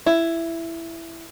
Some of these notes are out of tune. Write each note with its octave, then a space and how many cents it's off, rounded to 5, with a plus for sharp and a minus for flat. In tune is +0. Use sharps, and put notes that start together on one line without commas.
E4 +10